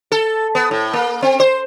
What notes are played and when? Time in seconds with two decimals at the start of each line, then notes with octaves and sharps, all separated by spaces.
0.12 A4
0.55 B3
0.71 A2
0.93 A#3
1.22 C4
1.40 C5